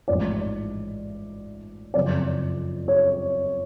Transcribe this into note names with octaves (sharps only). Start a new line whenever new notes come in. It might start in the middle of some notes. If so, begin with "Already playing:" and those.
A1 G#2 F3 D5
F#1 F2 F3 D5
C#5